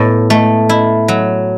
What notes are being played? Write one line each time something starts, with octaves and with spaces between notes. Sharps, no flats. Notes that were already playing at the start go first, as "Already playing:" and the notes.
Already playing: A2 B3
A3
E4
F#3